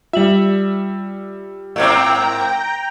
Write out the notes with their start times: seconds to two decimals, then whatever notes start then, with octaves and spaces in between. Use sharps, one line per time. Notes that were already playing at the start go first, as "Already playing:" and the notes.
0.13 G3 F4 E5 F#7
1.76 G#2 A#3 C4 G5 A#5